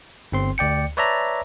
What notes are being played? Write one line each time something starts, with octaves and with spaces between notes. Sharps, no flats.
G1 C4 C6
D2 D5 G5 C#7
B4 C#5 D5 E5 A5 A#5